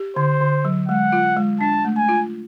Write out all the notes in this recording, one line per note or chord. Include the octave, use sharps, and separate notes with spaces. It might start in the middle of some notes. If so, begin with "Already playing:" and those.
Already playing: G4
D3 C5
D3
F#3
G#3 F#5
F4
G#3
D4 A5
A3
G#5
F4